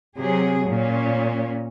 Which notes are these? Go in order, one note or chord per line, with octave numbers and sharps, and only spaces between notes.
C3 F#3 G#4
A#2 C#4